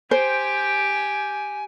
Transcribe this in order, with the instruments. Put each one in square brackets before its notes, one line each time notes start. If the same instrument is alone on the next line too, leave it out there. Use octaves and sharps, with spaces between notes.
[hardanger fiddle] G4 G5 [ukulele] C5 [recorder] G#5